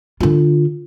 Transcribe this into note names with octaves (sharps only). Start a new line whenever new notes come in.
D3 F4